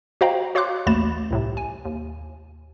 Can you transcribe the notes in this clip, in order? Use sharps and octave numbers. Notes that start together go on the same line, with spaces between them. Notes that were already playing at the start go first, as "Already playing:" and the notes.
F#4 C5 D#5 F5 G5 A#5
F#4 C#5 F5 C6 D6 F#6
A1 D#2 A3 B5 A6 E7
C2 A2 C3
G#5
D#2